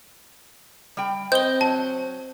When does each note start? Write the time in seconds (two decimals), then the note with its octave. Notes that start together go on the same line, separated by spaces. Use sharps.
0.97 G3 G5
1.32 C4 D#5 G6 G7
1.61 F#3 A5